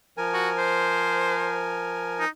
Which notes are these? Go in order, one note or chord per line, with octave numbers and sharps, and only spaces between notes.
F3 A#4 G#5
F#4
C5
D#4